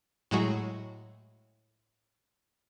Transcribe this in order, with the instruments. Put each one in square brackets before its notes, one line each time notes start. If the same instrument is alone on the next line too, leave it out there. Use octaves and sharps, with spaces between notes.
[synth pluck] A2 F#3 G#3 F#4